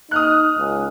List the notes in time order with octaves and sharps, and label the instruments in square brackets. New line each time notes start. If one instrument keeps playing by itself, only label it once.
[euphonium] D#4 [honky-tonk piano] D#6 F6 F#6
[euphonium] C#2